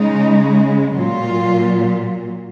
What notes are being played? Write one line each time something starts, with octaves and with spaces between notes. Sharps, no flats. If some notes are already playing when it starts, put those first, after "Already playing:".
Already playing: C#3 G#3 D#4
A#2 F#3 F4